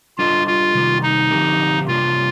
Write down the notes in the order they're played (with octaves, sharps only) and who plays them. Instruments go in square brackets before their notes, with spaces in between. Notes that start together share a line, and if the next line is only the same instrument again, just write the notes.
[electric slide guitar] G3 D4 A4 D#5 [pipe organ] F4
[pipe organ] F4
[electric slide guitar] C3 D#3 G3
[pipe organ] D#4
[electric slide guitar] D3 F3 C4 G4 A#4
[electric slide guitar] C3 G3 A#3 D4 [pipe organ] F4